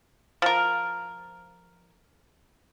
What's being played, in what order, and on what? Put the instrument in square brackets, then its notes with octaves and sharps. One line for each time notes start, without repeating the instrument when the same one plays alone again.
[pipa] F3 A#4